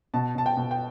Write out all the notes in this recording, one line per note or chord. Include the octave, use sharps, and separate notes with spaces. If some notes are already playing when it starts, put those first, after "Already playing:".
B2 A5
B2 A5
G5
B2
G5